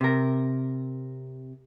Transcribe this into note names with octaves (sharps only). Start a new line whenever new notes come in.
C3 A#4